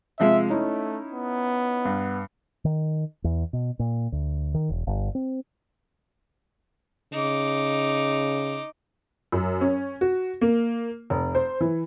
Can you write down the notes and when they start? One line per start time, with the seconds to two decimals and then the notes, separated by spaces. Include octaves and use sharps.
0.20 C3 F3 G#3 E5
0.50 A3 C#4 D#4 E4
1.12 B3
1.85 G2
2.65 D#3
3.24 E2
3.53 B2
3.79 A#2
4.12 D2
4.54 D#3
4.69 E1
4.87 G1
5.15 C4
7.13 C#3 D#4 D6
9.32 F#2
9.61 C#4
10.01 F#4
10.41 A#3
11.10 F1
11.35 C5
11.61 E3